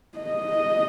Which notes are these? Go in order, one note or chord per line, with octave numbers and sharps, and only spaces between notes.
D#5